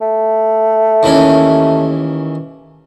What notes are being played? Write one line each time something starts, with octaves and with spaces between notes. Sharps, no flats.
A3
D#2 E3 C#4